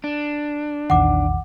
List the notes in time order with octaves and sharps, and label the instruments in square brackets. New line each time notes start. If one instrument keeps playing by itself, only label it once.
[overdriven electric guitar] D4
[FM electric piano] A#1 E2 D#3 [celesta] F#5 D6